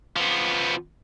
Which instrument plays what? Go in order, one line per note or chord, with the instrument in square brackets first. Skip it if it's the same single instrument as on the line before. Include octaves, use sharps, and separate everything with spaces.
[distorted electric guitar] F3 B3